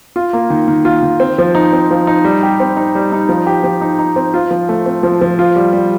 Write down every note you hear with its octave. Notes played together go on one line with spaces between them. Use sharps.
F4
A#3
D#3
D#3
F4
D#3
C4
F3
D#4
C4
F3
D#4
G3
G4
C4
D#4
G3
D#4
F3
G4
F3
D#4
D#4
C4
F4
F3
A3
C4
F3
F3
F4
G3
G3